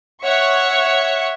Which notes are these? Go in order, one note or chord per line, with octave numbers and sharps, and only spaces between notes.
C#5 E5 F#5 C#6